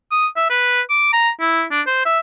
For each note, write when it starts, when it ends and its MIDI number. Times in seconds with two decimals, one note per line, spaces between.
0.12 0.27 87
0.36 0.49 76
0.50 0.81 71
0.90 1.12 86
1.13 1.30 82
1.40 1.64 64
1.71 1.82 62
1.87 2.03 72
2.05 2.19 76